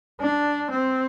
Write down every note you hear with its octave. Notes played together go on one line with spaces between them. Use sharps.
D4
C4